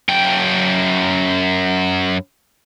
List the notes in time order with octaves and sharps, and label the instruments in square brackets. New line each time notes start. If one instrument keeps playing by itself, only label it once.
[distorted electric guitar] F#2 G5